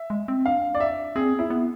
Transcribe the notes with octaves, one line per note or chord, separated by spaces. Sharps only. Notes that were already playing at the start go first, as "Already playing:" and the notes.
Already playing: E5
G#3
C4
D4 F5
D5
E5
C4 G#4
B3
E4
B3